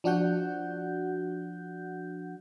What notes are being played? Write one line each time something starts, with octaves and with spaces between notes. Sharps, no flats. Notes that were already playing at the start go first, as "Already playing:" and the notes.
F3 D4 F#4 F#5 G6